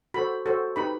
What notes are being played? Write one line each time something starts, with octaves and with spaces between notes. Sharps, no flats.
F#4 A4 C5 B5
F#4 A4 C5
D#4 G4 B4 B5